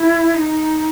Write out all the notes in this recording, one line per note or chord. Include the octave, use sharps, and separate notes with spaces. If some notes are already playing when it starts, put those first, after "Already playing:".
Already playing: E4
D#4